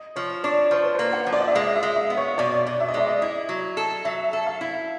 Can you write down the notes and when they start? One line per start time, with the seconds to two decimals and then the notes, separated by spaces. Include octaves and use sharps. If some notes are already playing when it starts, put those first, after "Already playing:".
Already playing: D#5
0.16 F3 C#5
0.44 D4 C#5
0.71 F3 C5
0.84 B4
0.95 A#3 C5
1.13 F#5
1.27 F3
1.33 D5
1.40 D#5
1.47 E5
1.55 G#3 F5
1.76 E5
1.83 G#3
1.96 D#5
2.10 B3
2.17 C#5
2.38 B2 D5
2.67 B2
2.80 E5
2.88 D#5
2.94 G#3 D5
3.06 D#5
3.22 E4 D#5
3.49 F#3
3.77 A4
4.05 F#3 E5
4.33 A4
4.46 F5
4.61 E4